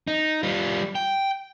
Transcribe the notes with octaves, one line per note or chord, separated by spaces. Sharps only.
D#4
G3 F4
G5